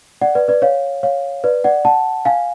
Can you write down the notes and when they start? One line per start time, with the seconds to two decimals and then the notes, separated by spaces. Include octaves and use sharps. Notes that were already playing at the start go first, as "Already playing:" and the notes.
0.21 D5 F#5
0.35 B4 D5
0.48 B4 D5
0.62 C#5 F5
1.03 C#5 F5
1.44 B4 D5
1.64 D5 F#5
1.85 F#5 A5
2.25 F5 G#5